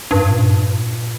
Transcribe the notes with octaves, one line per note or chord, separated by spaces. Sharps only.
G2
A#2